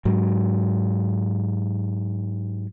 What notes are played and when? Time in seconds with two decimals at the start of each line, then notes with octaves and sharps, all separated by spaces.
0.05 G#2 F#3